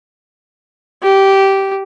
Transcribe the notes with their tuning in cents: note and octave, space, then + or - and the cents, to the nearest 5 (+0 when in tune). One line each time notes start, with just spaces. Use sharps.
G4 -10